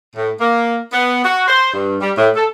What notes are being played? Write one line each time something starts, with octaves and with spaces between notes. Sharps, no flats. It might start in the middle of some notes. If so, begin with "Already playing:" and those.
A2
A#3
B3
F#4
C5
G2
G3
A2
A4